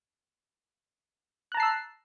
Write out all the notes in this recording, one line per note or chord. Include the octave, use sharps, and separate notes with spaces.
A5 A#5 E6 F#6 C7